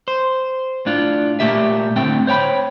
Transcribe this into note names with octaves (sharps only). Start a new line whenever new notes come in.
C5
A2 D4 F4
A#2 A3 A#3 G4 E5
A2 D3 A3 C4 G5
C5 C#5 G5 B5